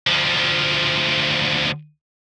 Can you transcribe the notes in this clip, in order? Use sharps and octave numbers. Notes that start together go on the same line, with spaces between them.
D2 F3